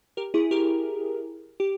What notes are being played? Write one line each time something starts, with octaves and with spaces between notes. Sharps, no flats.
G4 A#4
E4 G#4
G4 A#4
G4